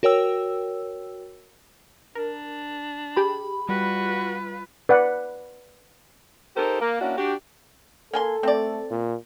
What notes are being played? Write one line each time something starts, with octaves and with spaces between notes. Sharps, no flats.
F#4 A#4 C#5 G5 E6
D4 A#4
G4 G#4 B5
G3 F4 F#4 B4
B4 D5 F#5
D#4 G4 A4 A#4 C5
A#3
A#3 C#4 D4 E4 F#4
D4 F#4 G4
A#3 A4 G#5 C6
A3 C4 D5
A#2